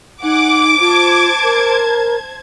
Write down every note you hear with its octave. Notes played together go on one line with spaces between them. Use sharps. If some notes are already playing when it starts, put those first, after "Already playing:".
D#4 F#5 G#5 D6
F4 C5 A5 G#6
A#4